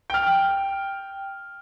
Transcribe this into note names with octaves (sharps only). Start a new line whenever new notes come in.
G5 F6